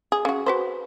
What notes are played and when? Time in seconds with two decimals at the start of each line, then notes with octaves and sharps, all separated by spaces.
0.12 G#4
0.25 C#3 F#4
0.46 F#4 B4 C5